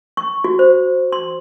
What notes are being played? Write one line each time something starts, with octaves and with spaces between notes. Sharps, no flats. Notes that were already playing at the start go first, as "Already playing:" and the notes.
C#6
F#4
C5
C6